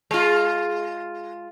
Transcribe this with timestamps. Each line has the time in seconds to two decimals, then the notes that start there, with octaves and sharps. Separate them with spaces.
0.11 G#3 F4